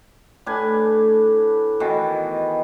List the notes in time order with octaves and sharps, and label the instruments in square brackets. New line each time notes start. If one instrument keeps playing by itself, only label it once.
[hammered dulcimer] A2 D4 B4 G#5
B2 D#3 E3